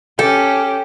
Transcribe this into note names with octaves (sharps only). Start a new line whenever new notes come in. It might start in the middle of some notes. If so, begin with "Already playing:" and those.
C#4 G4 A4 G5